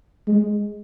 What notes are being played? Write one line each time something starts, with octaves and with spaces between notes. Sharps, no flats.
G#3